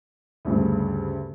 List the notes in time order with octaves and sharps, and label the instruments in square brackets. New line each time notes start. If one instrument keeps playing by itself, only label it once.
[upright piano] D2 G2 C#3